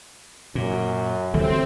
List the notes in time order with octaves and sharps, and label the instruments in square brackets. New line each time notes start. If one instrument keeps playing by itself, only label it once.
[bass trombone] F#2 [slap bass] A#2
[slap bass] D2 E3 G3 [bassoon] A3 [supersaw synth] C4